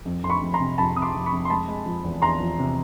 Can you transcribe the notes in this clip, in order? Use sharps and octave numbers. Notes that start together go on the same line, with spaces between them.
F2
F2 C6
B5 C#6
F2
A#5 C6
C3
F2 A5 B5
C3 D#6
C6 D6
F2
B5 C#6
F2
C6
G#3 A5 B5
G#3
F3
E2
E2 A#5 C6
F3
C3